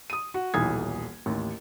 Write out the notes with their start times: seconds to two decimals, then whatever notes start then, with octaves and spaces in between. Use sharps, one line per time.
0.10 D#6 D#7
0.34 F#4
0.54 D#1 B1 E3 D#6 G#6
1.26 A1 D#2